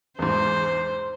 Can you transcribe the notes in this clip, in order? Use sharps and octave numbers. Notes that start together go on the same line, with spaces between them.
E2 G#2 C5